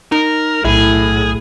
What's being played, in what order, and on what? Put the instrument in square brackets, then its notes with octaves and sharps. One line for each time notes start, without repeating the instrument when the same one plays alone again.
[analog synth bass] D#4 [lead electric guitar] A#4
[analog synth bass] B1 [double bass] A2 [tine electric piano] E4 [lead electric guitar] G#4